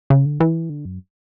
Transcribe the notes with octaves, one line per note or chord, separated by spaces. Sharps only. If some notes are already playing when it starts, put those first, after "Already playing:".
C#3
D3
E3
D3
F#2